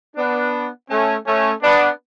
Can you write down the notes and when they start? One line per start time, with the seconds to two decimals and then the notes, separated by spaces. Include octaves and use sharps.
0.16 B3 D4
0.90 A3 C#4
1.26 A3 C#4
1.63 B3 D4